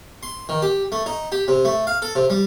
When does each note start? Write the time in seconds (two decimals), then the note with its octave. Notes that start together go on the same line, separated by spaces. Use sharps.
0.23 C6
0.49 D#3
0.62 G4
0.92 A3
1.06 D#4
1.32 G4
1.48 C3
1.65 A3
1.87 F5
2.02 A4
2.15 C3
2.30 G3